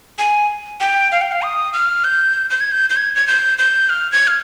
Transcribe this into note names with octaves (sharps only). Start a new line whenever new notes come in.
G#5
G5
F5
G5
F5
D#6
F6
G6
G6
G#6
G6
G6
G#6
G#6
G6
G6
F6
G#6
F6